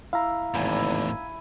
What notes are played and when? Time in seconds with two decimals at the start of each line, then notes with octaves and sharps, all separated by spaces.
0.13 E4 F5 A#5
0.54 G#1 E2 A2 G#5 B5